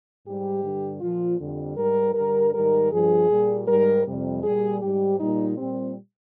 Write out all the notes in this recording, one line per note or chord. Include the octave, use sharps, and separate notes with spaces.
G#2 G3 G4
G2 D3 G3
A#2 F3 F4
F2 D3 G3
G#2 G3 A#4
G2 D3 G3 A#4
G#2 D#3 G3 A#4
G2 F3 G#4
A#2 G3
G#2 G3 A#4
F2 C3 G3
A#2 G3 G#4
G#2 G3 G4
A#2 G3 D#4
A#2 G3 C4